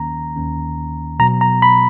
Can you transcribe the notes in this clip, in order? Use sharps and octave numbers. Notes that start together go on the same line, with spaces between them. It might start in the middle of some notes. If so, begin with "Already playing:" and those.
Already playing: D#2 D#3 A#3 C#4 A#5
D#2 D#3 A#3 C#4
B2 F#3 B3 A#5
A#5
B5